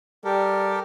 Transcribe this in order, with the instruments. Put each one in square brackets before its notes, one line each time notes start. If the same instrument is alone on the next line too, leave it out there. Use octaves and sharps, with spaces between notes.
[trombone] G3 [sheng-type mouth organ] G4 A4 A#4